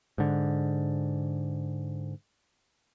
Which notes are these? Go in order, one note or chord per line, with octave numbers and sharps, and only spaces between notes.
G#2 D3